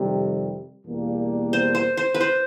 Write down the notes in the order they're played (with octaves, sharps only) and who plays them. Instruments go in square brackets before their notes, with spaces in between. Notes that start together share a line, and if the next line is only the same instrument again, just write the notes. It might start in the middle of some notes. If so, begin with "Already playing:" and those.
Already playing: [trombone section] F2 C3 D#3 G3
E2 B2 G3 A#3 D4
[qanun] C5
C5
C5
B4
C5